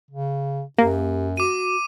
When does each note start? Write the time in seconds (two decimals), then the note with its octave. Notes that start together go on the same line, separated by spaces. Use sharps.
0.11 C#3
0.78 F#2 A#3 G4
1.37 F#4 D6 D#7